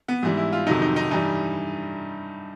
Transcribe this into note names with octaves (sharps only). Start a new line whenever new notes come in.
B3
G#2 E3 G3
E4
F4
F2 C3 D#3 F#3 D#4
D#4
D#4
G2 E3 G3 D#4